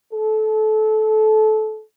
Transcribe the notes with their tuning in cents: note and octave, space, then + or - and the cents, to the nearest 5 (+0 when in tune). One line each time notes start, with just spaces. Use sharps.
A4 -25